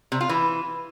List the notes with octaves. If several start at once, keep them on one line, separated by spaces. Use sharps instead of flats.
C3
F4
E3